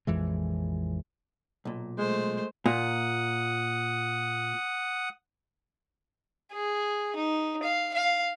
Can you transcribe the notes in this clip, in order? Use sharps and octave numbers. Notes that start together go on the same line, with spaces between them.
A#1 F2 E3 G#3
B1 A#2
G#3 A3 C5
A#2 F#5 D#6
G#4
D#4
F5
F5